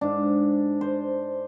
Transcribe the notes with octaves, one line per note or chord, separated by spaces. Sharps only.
G#2 D4
C5